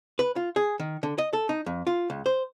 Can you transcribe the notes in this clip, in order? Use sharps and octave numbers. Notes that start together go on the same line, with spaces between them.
B4
F4
G#4
D#3
D3
D#5
A4
D#4
F2
F4
C#2
C5